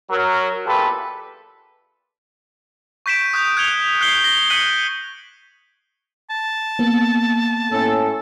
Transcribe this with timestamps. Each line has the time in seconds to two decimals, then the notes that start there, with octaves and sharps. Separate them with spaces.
0.10 F#3 A#4
0.66 E2 A#2 F4 G4 A4 B4
3.06 C#6 G6 B6 D7 E7
3.33 D#6 F#6 G6
3.57 F#6 G#6 C#7 F7 G7
4.01 F#6 G6 C7 C#7 G7
4.24 A#6 G7
4.50 F#6 B6 C#7 D#7 F#7
6.30 A5
6.79 A#3 B3
7.72 A2 C#4 A4